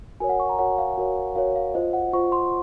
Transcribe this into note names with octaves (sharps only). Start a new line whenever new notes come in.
F#4 A#4 C#5 G#5
F#5
C#6
A#5
F#4 A#4 C#5 F#5
F5
F#4 A#4 C#5
F#4 A#4 C#5 F5
F5
F4 C5 D#5
F#5
F4 C5 C#6
C6